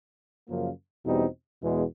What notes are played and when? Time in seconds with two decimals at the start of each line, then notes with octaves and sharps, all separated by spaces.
0.48 F#2 C#3 F3 A#3
1.05 E2 B2 G3 C4 D#4
1.62 E2 B2 G#3